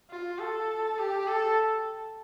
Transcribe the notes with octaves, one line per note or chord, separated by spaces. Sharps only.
F4
A4
G4
A4